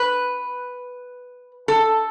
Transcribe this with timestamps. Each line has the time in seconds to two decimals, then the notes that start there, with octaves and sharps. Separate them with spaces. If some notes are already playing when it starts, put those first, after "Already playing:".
Already playing: B4
1.68 A4